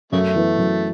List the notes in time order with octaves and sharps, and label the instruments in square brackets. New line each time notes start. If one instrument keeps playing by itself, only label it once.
[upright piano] F#2 [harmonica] C#3 A3
[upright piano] E3 B3
F#2